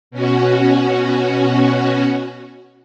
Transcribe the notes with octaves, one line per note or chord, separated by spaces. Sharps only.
B2 C#4 F#4